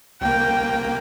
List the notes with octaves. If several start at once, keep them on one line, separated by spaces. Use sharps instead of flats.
C2 A#3 G5